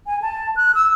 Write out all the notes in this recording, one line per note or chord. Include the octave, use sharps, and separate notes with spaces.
G#5
A5
F#6
E6